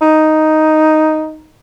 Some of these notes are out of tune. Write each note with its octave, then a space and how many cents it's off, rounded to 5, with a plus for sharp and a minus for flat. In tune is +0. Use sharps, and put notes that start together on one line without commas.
D#4 +0